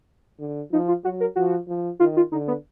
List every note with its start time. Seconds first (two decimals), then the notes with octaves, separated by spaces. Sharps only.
0.40 D3
0.72 F3 D#4
0.88 F4
1.04 F#3 F#4
1.20 A#4
1.36 F3 F#4
1.68 F3
1.99 D#3 F4
2.17 F4
2.32 D3 D#4
2.47 B3